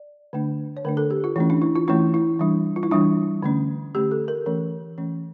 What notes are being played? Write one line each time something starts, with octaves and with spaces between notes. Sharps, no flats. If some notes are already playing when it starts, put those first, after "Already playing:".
Already playing: D5
D3 A3 D4
C#5
D3 A3 D4 A#4
A4
G4
F4
E3 A3 C#4 E4
D4
E4
F4
E3 A3 C#4 E4
E4
E3 G3 D4
F4
E4
E3 G3 D4
D3 A3 C#4
D3 A3 C#4 G4
A4
A#4
E3 A3 C#4 A#4
E3 A3 C#4